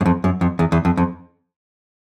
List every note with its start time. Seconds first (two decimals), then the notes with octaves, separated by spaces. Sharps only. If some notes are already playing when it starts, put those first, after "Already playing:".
0.01 F#2
0.06 F2
0.24 F#2
0.41 F2
0.59 E2
0.72 E2
0.85 F2
0.97 F2